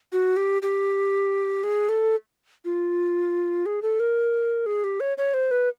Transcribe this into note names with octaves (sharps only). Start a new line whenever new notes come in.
F#4
G4
G4
G#4
A4
F4
G#4
A4
A#4
G#4
G4
C#5
C#5
C5
B4